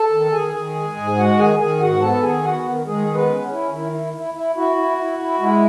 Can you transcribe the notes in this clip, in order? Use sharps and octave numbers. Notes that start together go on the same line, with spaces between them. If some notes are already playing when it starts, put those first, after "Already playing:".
Already playing: A4 A5
D#3
D#3 G#4 G#5
D#3
G#3
G#2
G#3 F#4 F#5
D#3 G#4 G#5
D#3 G#4 G#5
G#2 F#4 F#5
B3 A4 A5
D#3 G#4 G#5
B3 F#4 F#5
D#3
D#3 G#3 G#4
G#3
B3 B4
C#4
E4
D#3 E4
E4
E4
E4
E4 F#4
E4
E4
E4
G#3 E4